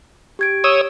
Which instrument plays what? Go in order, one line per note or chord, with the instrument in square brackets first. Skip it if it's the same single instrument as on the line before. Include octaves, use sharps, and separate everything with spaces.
[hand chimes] G4 G#6 D7
[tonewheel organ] C#5 D#6 E6